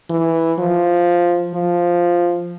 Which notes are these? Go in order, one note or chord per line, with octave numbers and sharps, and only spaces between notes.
E3
F3
F3